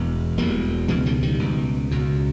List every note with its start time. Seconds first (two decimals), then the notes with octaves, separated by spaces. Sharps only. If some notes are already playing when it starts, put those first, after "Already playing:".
Already playing: E1 E2 B2
0.37 E1 E2 B2 G3 A#3
0.88 C#2 B2 E3 G#3
1.06 D#3 G3
1.23 D#3 G3
1.39 C#2 B2
1.91 C#2 B2